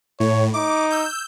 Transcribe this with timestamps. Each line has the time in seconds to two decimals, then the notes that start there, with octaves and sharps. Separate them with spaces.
0.20 A2 C#5
0.53 D#4 D6
0.90 E6 G6